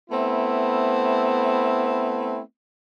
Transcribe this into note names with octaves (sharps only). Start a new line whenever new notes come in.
A3 B3 C4 E4